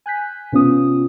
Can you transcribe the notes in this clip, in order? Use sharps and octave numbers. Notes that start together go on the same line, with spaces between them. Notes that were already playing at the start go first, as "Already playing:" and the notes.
G#5 F#6 G6 B6
C3 B3 C#4 F4 D#6